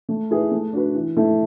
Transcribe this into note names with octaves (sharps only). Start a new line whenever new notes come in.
A3
E4 G#4 B4
A3
D4 F#4 B4
E3
A3 E4 A4